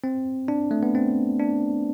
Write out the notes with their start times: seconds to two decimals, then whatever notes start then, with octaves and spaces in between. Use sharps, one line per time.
0.04 C4
0.48 D4
0.71 A3
0.83 B3
0.95 C4
1.40 D4